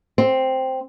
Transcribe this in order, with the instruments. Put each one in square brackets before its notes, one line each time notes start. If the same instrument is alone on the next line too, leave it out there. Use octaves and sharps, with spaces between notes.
[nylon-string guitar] C4